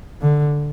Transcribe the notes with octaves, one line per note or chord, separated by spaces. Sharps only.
D3